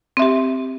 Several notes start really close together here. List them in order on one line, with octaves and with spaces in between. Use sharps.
C4 E5 G4